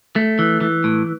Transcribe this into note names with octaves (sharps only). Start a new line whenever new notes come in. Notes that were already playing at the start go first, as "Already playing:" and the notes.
A3
E3
E3
A2